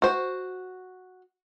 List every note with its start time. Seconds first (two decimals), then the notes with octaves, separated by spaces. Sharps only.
0.02 F#4 C5